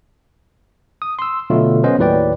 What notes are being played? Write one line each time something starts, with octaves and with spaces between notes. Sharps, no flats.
D#6
C6 E6
B2 D3 F#3 A3 F4
B3 C#4 C5 D#5
D#2 A2 F#3 B4 D5 G5